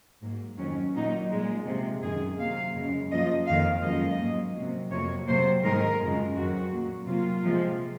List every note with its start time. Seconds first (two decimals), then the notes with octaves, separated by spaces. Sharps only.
0.22 G#2 F#3 A#3
0.58 F2 D#3 F#3 C#4
0.95 A#2 F#3 A#3 D#4
1.30 A#2 G#3
1.66 C3 F3 G#3
2.02 F#2 D#3 G#3 G#4
2.38 C3 F#3 A#3 F5
2.75 F#2 C#3 G#3
3.11 F#2 F3 A#3 D#5
3.46 F2 D#3 A#3 F5
3.83 F#2 F3 G#3 D#5
4.19 G#2 F#3 A#3
4.56 C3 F#3 A#3
4.91 F2 C3 F#3 A#3 C#5
5.27 C3 F#3 A#3 C5
5.63 G#2 D#3 G#3 A#4
6.00 F#2 C#3 F3 G#3
6.35 F2 D#3 F#3 F#4
6.72 A#2 F#3 A#3
7.07 C3 F#3 A#3 F4
7.44 C3 F3 G#3